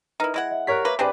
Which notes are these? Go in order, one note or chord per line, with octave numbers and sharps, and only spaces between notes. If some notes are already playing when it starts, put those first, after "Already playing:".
D#4 E4 A#4 B4 F6
G#3 E4 F#5 G#6 A#6
D#5 E5
G4 A#4 C#5 D5 F#6 B6
A#3 B4 E5 D6
C4 D4 G4 G#4 B4 D5